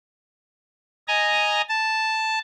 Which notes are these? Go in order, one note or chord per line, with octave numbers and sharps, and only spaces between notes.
D#5 G#5 A#5
A5